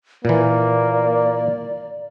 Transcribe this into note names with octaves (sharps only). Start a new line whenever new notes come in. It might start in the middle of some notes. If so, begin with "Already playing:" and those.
A#2 E3 A#3 D5